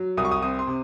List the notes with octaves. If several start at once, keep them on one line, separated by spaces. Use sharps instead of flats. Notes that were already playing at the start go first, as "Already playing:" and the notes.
Already playing: F#3
C2 D#6
C#6
D#6
C4 D#6
C6
C3